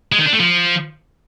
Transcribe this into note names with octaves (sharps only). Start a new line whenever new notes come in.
G#3
D#3
D4
A3
F3